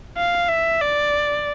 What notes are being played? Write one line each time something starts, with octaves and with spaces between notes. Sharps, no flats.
F5
E5
D5